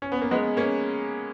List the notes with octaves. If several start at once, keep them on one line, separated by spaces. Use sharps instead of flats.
C#4
B3
A#3
G#3 B3
A#3 C#4